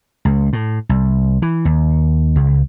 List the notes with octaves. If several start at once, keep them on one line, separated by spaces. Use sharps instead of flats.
C#2
A2
C2
E3
D#2
C#2